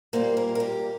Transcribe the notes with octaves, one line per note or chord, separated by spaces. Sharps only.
A#2 G3 A#3 C5
A#4
A#4
G4